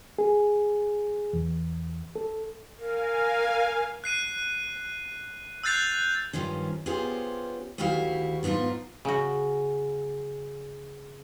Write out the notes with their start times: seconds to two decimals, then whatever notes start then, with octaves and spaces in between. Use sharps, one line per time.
0.19 G#4
1.33 E2
2.16 A4
2.78 A#4 F5 G#5
4.04 F#6 C7 D#7
5.63 E6 F#6 G6 A6 C7 F7
6.33 G2 D#3 F3 C#4
6.86 B3 C#4 F4 G4 G#4 C5
7.78 D2 D#3 E4 F#4 G4 F5
8.43 G#2 B3 D4 D#4 F4
9.05 C#3 F#4